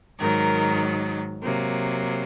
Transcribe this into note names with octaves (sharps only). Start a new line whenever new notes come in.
G#2 D#3 F#3 A#4
C3 F#3 A#3